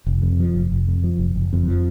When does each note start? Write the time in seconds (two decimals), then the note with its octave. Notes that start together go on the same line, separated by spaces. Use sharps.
0.07 F1
0.22 F2
0.40 F3
0.55 F1
0.72 F1
0.87 F2
1.04 F3
1.19 F1
1.36 F#1
1.53 F2
1.68 F3